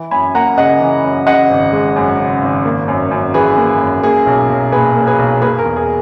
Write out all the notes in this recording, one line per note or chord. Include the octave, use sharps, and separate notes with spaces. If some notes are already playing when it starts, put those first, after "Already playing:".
Already playing: E3
F#2 G#5 B5
A#3 F#5 A#5
C#3 D#5 F#5
E3
F#2
C#3 D#5 F#5
G#1
G#3
F#2
C#3
G#1
A#3
F#2
F#2
E3 G#4 B4
A#3
F#2
A#3 G#4
B1
B1
A#2 G#4 B4
A#3
G#4 B4
B1
A#3 G#4 B4
A#4
E2
G#4